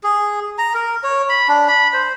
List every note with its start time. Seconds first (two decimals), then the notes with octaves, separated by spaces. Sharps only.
0.03 G#4
0.58 A#5
0.74 A#4
1.04 C#5
1.29 B5
1.48 D4
1.68 B5
1.93 C5